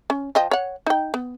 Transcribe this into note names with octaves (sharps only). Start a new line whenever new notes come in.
C#4
F3 D#5 G5
C#5 F#5
D#4 G5
B3